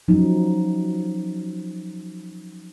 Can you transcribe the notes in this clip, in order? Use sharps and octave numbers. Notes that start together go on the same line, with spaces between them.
F3 F#3 C#4 D#4